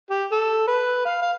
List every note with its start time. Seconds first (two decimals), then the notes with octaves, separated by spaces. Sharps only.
0.10 G4
0.32 A4
0.67 B4
1.05 F5
1.22 F5